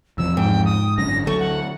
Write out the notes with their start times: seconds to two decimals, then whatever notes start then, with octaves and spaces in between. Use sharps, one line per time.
0.18 E2 C3 F3 E6
0.37 G#2 G5
0.65 D#6
0.97 G#1 F#2 D3 A#6
1.27 D2 F#3 A3 C#6
1.39 F#5